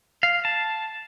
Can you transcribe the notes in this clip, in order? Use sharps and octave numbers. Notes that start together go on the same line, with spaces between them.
F5
A5